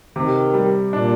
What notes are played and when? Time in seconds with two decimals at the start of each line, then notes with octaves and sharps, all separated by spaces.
0.15 C3 D#3
0.54 G3
0.92 A#2 D4